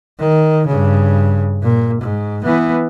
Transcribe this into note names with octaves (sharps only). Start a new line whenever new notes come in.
D#3
G2 C#3
A#2
G#2
E3 B3